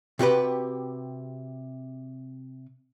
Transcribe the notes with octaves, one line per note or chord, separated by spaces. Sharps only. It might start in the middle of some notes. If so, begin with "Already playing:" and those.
C3 F#4 G4 B4